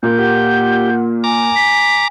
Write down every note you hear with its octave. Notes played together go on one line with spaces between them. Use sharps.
A#2 A#3 G6
G4 F#5
G#5 A#5 D6
B6